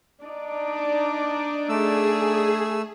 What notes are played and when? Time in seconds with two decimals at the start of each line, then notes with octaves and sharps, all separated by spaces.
0.24 D4 D#4 D5
1.69 A3 G#4 E6